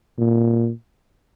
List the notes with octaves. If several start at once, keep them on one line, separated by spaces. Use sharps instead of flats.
A#2